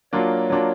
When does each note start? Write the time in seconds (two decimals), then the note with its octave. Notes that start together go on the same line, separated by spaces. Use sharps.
0.13 F#3 A#3 D4 F4 C#5
0.50 F#3 A#3 D4 F4